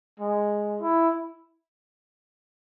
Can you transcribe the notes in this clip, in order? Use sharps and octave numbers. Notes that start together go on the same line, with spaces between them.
G#3
E4